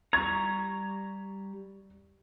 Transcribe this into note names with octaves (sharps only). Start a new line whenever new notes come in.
G3 A#5 C#6 G#6